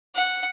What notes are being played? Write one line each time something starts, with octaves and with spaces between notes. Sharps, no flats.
F#5